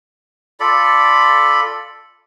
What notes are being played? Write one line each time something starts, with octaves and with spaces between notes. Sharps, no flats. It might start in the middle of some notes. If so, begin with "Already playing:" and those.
F4 A4 D5 B5